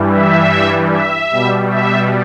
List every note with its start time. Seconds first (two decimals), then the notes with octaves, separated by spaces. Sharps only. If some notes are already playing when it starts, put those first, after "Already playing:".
Already playing: G2 E3 G3
0.12 E5
0.92 E5
1.31 B2 G3
1.71 E5